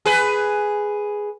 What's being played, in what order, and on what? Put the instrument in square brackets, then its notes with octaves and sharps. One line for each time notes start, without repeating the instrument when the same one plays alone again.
[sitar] G#4 B4